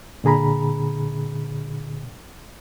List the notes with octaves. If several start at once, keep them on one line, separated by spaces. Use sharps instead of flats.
A#2 D3 G#4 A#5 B5